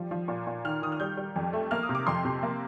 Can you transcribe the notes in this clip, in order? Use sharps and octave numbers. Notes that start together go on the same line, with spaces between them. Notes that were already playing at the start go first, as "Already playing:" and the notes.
Already playing: F3 G3
F3
A#2
A#2
D#3 F6
D#3 D#6
F6
G3 G6
G3
F2
A3
A#3 F6
D#6
C3
D6
F2 C6
C3
A#3